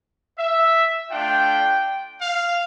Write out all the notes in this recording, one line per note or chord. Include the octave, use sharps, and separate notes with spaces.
E5
A3 D4 F4 G5
F5